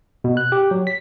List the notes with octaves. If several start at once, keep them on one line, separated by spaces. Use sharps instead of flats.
B2
F#6
G4
F#3
B6